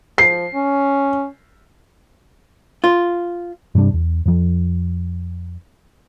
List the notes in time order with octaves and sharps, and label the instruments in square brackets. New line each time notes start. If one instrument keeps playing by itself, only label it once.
[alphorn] F3 [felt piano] C7
[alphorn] C#4
[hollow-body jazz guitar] F4
[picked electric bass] G2 C3 G3 D4
E2
F2 F3